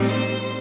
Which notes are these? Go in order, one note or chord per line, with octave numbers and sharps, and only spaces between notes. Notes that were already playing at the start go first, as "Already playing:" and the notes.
Already playing: A2 G3 C4 D#4
C5